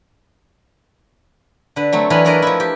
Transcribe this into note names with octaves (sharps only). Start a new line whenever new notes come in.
D3 B4
F#3 A3 C4
E3 F#3 D4 B4 D#5 F5
D4 F#4 A#4 B4 D5 D#5
F3 E4
G4